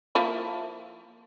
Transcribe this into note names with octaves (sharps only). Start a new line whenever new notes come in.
F3 A#3 E4